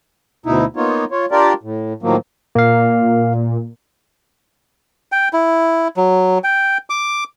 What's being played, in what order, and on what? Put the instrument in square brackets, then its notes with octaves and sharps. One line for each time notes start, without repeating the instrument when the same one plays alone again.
[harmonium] D2 B2 D#4 E4
A#3 B3 D#4 F4 C#5
F4 C#5
D4 F4 G4 A#4 D5
A2
A2 D#3 F3 F#3 A#3
[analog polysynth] A#2 [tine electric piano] A#3 F5
[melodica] G5
E4
F#3
G5
D6